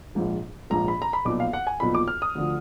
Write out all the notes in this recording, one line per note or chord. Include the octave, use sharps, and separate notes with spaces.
A#1 G#2 F3
A#1 G#2 F3 A#5
B5
A#5
B5
B1 A#2 F3 D6
F5
F#5
G#5
B1 A#2 F3 B5
D6
F6
D#6
D2 D3 F3